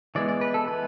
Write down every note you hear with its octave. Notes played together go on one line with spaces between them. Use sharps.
E3 G#3 B3 D5
D5
B4
A4
E3 G#3 B3 B4